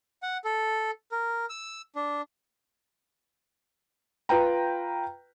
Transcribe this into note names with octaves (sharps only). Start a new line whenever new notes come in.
F#5
A4
A#4
E6
D4
F4 B4 G5 A#5